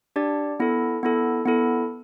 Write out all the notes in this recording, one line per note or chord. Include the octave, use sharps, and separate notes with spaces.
D4 G4 D5
B3 E4 A4
B3 E4 A4
B3 E4 A4